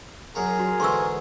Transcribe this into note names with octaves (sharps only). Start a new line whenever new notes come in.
F#2 G#4 A#4 F#5 A#5
F#4
G#2 D3 E3 C6 C#6 E6